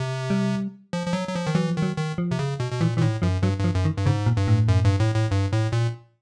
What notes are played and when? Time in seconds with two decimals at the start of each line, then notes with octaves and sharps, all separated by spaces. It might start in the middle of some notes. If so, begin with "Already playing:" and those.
Already playing: C3
0.30 G3
0.93 F3
1.07 F3
1.13 F#3
1.28 F#3
1.35 F3
1.47 D#3
1.55 E3 F#3
1.68 F3
1.76 D#3
1.82 F#3
1.97 D#3
2.18 F3
2.31 C3
2.39 C#3
2.60 B2
2.72 B2
2.81 A#2 E3
2.97 A#2 E3
3.01 A2 D#3
3.22 F#2 F3
3.43 G2 F#3
3.59 G2 F3
3.75 F#2
3.85 D#3
3.97 G2
4.06 G#2 C#3
4.26 A#2
4.37 G2
4.48 A2
4.68 F#2
4.85 G2
5.00 A2
5.15 A2
5.31 G2
5.53 A2
5.72 A#2